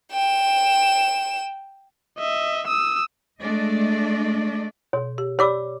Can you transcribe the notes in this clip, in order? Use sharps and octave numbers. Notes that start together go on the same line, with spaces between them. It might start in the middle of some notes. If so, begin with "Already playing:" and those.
G5 E7
D#5 E5
D#6 E6
G#3 A3 D4 D5 D#5
B2 C#5
G4
G4 C#5 D5 B5 D6 E6